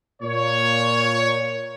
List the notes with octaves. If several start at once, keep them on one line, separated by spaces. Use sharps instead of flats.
A#2 C#5